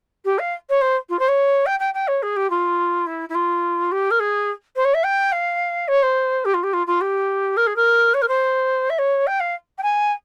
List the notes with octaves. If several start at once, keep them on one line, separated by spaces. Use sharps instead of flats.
G4
F5
C#5
C5
F4
C5
C#5
G5
G5
G5
C#5
G#4
G4
F4
E4
E4
F4
G4
A#4
G#4
C5
C#5
E5
G5
F5
C#5
C5
G4
F4
G4
F4
F4
G4
A#4
G#4
A#4
C#5
A#4
C5
E5
C#5
G5
F5
G5
G#5